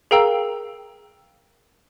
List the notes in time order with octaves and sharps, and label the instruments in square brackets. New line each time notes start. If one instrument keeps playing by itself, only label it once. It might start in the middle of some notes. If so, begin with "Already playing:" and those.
[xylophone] G#4 A#4 F5 G5 A#5 E6